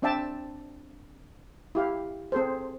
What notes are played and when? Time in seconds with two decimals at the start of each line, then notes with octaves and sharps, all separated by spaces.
0.02 C4 D4 D5 E5 G5 A5
1.75 E4 G4 F5
2.32 C4 G#4 A4 C5